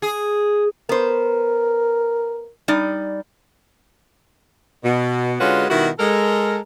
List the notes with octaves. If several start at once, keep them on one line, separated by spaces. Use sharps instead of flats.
G#4
B3 A#4 C5
G3 D#4 D5
B2
D3 G#3 C#4 F4 F#4 B4
B2 D#3 G3 E4 F#4
G#3 A4 A#4